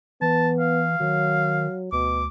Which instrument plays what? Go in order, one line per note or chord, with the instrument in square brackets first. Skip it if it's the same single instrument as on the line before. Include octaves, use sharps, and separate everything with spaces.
[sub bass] E3 [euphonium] B3 [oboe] A5
[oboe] F5
[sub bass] D#3 [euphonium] F#3
[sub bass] D2 [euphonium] B2 [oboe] D6